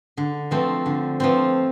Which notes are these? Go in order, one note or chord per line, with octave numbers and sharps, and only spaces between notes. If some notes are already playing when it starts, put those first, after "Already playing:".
D3
F3 A3 C4
D3
F3 A3 C4